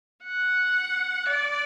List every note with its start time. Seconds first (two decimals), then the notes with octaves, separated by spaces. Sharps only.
0.23 F#5
1.26 D5